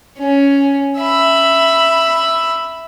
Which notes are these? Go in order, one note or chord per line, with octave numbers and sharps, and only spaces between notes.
C#4
E5 B5